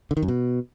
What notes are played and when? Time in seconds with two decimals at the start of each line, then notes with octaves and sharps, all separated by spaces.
0.11 D3
0.17 D#3
0.23 F#2
0.28 B2